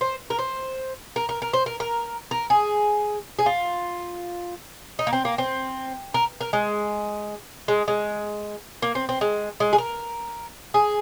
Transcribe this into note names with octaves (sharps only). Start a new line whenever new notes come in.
C5
A#4
C5
A#4
A#4
A#4
C5
A#4
A#4
A#4
G#4
G#4
F4
D#4
A#3
C4
A#3
C4
A#4
A#4
G#3
G#3
G#3
A#3
C4
C4
G#3
G#3
G#4
A#4
G#4